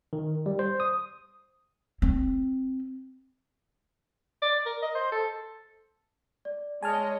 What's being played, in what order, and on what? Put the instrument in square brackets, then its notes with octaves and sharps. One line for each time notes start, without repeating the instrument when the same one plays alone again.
[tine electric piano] D#3
G3
C5
D#6
[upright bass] C4
[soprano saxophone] D5
A#4
D#5
C5
A4
[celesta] D5
[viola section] G#3 C#5 D#5 [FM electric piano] G#5 A5 F6